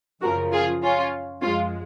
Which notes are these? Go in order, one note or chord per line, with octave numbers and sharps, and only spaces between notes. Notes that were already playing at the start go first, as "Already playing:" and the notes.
F#2 C#3 F3 F#4 A#4
F4 G#4
C#4 F4
F#2 F3 G#3 C#4 F4